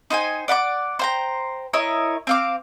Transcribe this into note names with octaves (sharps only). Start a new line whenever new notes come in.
D#4 C5 G5 G#5
D5 F#5 B5 D6
C5 G5 A#5
E4 A#4 C#5 D#5
C4 F5 D6